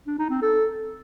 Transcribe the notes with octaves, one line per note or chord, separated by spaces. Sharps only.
D4
D#4
C4
A4